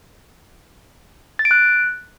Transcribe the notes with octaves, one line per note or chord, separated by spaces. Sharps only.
A6
D7
F#6